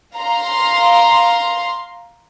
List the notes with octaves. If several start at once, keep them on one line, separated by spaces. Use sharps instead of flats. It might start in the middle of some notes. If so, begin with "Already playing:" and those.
F5 A#5 C6